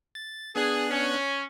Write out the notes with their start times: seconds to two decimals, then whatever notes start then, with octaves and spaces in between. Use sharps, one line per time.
0.15 A6
0.56 B3 D4 G#4 F#6
0.90 C#4